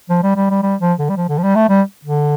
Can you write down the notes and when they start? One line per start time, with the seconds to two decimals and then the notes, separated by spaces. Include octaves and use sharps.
0.10 F3
0.23 G3
0.36 G3
0.50 G3
0.63 G3
0.81 F3
0.99 D3
1.09 G3
1.17 F3
1.29 D3
1.38 F3
1.43 G3
1.55 A3
1.69 G3
2.05 D3